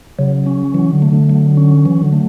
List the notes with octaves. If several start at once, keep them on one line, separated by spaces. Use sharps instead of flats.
C#3 F#3
C#4
E3 F#3
D3
A3
D3
F#3
C#4
E3 F#3
D3
A3